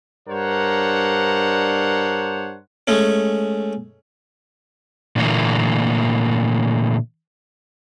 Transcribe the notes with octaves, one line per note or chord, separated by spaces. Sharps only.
G2 D4 A#4 C5 C#5 F#5
G#3 A3 C#4
A#2 D3 E3 A3 A#3